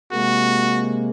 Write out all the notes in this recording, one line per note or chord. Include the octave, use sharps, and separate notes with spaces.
C3 G#3 A#3 F#4